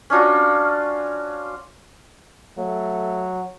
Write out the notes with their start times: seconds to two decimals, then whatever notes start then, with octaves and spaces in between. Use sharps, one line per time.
0.10 C#4 D4 F4 F#4
2.58 F#3 A3